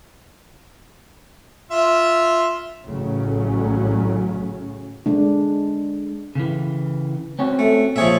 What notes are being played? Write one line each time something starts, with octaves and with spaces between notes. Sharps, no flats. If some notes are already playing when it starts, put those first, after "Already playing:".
F4 E5
A1 A2 C#3 F#3 C#4
G#3 D4
C#3 E3
C4 C#4 F#4
A3
A#2 F3 G#4 C#5 E5